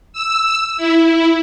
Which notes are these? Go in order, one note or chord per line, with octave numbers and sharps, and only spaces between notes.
E6
E4